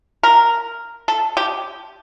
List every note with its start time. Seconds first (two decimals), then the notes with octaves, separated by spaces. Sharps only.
0.23 A#4
1.08 A4
1.37 G4